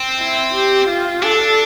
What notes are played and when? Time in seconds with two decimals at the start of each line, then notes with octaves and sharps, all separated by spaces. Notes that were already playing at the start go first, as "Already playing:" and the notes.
Already playing: C4
0.18 E4
0.53 G4
0.87 F4
1.23 D4 A4